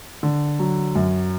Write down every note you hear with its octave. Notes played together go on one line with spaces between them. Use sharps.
D3
F#3
F#2